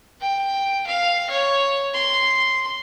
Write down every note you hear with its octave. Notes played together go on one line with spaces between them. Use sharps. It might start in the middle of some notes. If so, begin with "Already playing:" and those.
G5
F5
C#5
C6